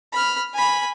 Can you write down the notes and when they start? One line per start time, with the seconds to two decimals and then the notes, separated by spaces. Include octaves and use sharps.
0.13 B5 F6
0.54 G#5 B5